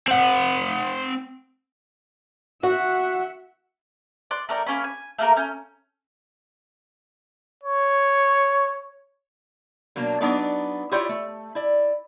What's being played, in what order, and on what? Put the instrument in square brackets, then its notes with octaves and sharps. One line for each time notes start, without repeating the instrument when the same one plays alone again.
[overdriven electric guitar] C4 F#5
[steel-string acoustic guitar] F#4 [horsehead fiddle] E5 F#5
[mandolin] D5 C6 F#6
A3 A#4 D5 G5
A#3 C#4 C#5 B5
G#5
A3 A#3 A#4
C#4 G6
[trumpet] C#5
[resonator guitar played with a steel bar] B2 F#3 A#3 D4
F#3 B3 D4 D#4 D5
E4 F4 G4 C#5 D5 G5
A3
E4 D5